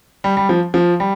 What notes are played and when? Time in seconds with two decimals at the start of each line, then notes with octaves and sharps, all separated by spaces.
0.24 G3
0.37 G3
0.49 F3
0.74 F3
1.00 G3